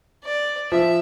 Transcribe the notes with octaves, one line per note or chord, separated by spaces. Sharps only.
D5
F3 E5